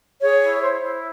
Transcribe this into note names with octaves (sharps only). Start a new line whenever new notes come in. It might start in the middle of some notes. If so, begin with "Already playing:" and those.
G#4 C#5
E4
C5
E4